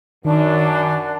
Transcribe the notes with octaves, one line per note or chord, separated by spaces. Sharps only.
F#2 D#3 D4